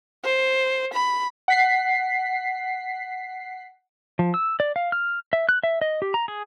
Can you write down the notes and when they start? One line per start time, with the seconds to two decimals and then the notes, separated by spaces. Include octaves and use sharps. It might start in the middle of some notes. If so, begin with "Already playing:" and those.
0.24 C5
0.94 B5
1.48 F#5 B6 C7
4.19 F3
4.34 E6
4.60 D5
4.76 F5
4.92 F6
5.33 E5
5.49 F#6
5.63 E5
5.81 D#5
6.02 G4
6.14 A#5
6.28 G#4